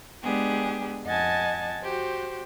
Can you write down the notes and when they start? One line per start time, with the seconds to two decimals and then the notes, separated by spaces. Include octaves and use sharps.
0.23 G#3 B3 D4 G4 G#4
1.06 F2 D#5 F#5 G#5 A5 A6
1.81 F#4 G4 C5